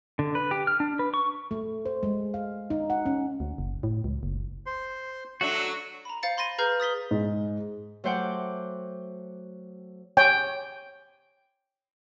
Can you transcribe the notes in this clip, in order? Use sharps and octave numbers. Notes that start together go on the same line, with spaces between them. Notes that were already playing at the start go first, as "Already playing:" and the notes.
D3
B4
G4
F6
D4
B4
C#6
A3
C5
G#3
F5
D#4
F#5
C#4
D2
F#1
A2
C#2
F#1
C5 C6
F#3 A3 D4 F#4 C#6
A#5 B5
C5 F5 A6 C#7
B5 C6 A6 A#6 D#7
G#4 B4 A#5 F6 G6 C7
D#6 A6 B6 G7
G#2
F#3 A3 C5 F#5 G5 D6
C#5 G5 G#5